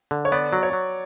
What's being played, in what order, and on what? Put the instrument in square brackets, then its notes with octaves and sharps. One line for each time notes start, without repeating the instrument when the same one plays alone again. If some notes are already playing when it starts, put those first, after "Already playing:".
[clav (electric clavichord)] D3
[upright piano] C#5
[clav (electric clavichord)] B3 [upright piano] D5
[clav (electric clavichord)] F#3
[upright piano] C#5
[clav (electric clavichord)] F#3